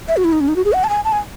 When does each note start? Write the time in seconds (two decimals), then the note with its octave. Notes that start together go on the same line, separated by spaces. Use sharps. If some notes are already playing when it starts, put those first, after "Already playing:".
0.08 E5
0.17 F#4
0.24 E4
0.32 D#4
0.41 C#4
0.48 D#4
0.56 F#4
0.65 G#4
0.73 F#5
0.84 A5
0.89 G#5
1.05 A5
1.12 G#5